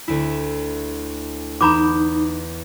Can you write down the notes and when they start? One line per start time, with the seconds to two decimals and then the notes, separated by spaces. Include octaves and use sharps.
0.08 D2 E4
1.61 E2 D#4 A#5 B5 D6 G6